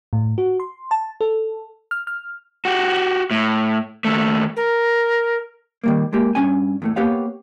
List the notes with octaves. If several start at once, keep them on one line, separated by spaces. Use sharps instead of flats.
A2
F#4
C6
A5
A4
F6
F6
F#4 G4
A2
D#2 A3
A#4
D#3 G3 A#3
G#3 A#3 G4
G2 F3 C#4 G#5
E2 A2 A3
A#3 B3 G4 C#5 F5